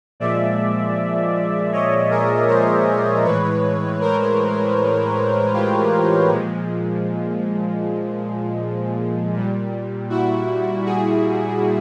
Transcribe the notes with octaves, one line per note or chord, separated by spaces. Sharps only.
A#2 F3 G#3 D5 E5
C#5 D#5
G#4 A#4
A#4 C5
A2 E3 G#3 B4 C#5
A#4 C5
F4 G4
A#2 F3 G#3
A#2 G3
E4 F#4
F#4 G#4